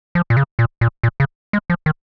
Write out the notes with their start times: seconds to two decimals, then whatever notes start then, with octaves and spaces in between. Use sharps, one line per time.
0.15 F3
0.30 A#2
0.37 C#3
0.59 A#2
0.81 A#2
1.03 A#2
1.20 C#3
1.53 G#3
1.70 F3
1.86 D#3